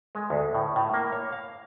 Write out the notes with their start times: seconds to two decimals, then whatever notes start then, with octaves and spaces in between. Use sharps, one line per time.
0.15 G#3
0.30 D2
0.54 A2
0.76 A2
0.94 A#3
1.12 C#5
1.32 F5